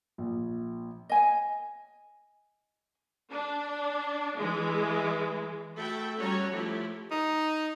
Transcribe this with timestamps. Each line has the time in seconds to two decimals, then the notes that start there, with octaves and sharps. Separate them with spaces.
0.18 A#1
1.09 D#5 G#5
3.31 D4
4.37 E3 G#3
5.76 A3 F#4 A4 E5 G5 B5
6.18 G3 C#4 F#4 A4 C#5 A#5
6.53 F3 A3 E4 G4
7.11 D#4